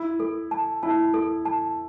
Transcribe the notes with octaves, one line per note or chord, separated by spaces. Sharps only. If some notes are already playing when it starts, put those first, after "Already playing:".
Already playing: E4
A4
A5
E4 A5
A4
A5